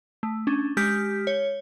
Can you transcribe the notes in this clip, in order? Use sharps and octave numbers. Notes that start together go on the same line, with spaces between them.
A3
C#4 D4
G#3 G4 F6 G6 B6
C#5